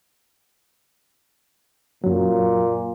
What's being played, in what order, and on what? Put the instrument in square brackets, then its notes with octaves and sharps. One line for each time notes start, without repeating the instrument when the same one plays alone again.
[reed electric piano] F#2 F#3 [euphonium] A#2